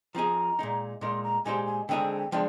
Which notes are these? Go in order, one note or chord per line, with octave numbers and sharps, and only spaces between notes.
F3 C4 D#4 G#4 A#5
A#2 G#3 D#4
A#2 G#3 D#4 A#4 C6
A#5
A#2 G#3 D#4 G4 C5 G#5
G#5
D3 G#3 C4 D#4 G#4 G5
F3 G#3 D4 G5